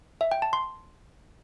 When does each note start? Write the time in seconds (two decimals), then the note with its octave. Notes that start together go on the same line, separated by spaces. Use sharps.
0.21 E5
0.31 G5
0.42 A5
0.53 C6